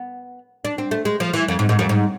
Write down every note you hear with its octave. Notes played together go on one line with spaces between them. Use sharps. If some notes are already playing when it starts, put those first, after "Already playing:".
Already playing: B3
D4
C4
A3
G#3
F3
E3
F2
G#2
G#2
F2
G#2